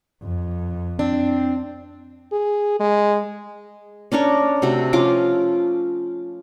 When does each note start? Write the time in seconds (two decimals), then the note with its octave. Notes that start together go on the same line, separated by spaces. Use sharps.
0.23 F2
0.99 C4 D4
2.32 G#4
2.80 G#3
4.12 C#4 D4 A#4 C#5
4.62 C3 A3 F#4
4.93 F3 C#4 F4 D6